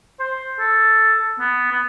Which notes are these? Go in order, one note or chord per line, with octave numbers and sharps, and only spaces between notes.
C5
A4
B3
B3